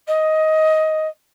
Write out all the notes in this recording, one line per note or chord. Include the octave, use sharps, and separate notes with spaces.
D#5